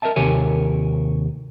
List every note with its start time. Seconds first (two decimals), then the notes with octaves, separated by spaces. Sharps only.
0.02 A#4 C5 D#5 E5 A5
0.16 D#2 C3 G4 A#4 C#5 G#5